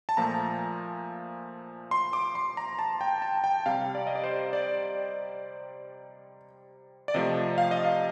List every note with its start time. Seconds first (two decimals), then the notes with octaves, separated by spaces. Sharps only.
0.09 A5
0.17 A#2 F3 A3 A#5
1.91 C6
2.13 D6
2.35 C6
2.57 A#5
2.79 A5
3.01 G5
3.22 A5
3.44 G5
3.66 C3 G3 F5
3.95 D5
4.07 D#5
4.15 D5
4.24 C5
4.53 D5
7.08 D5
7.14 C3 F3 A3 D#5
7.58 F5
7.71 D#5
7.85 F5